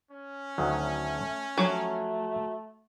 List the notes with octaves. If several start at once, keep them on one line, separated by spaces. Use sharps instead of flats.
C#4
D2 D#3 F#3 A3
F3 F#3 A3